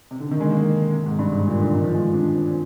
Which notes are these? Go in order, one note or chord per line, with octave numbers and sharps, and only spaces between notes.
C3
D3
D#3
G#3
A#3
C3
G#2
G2
G#2
A#2
D3
D#3
F3
G#3
D4
C4
C4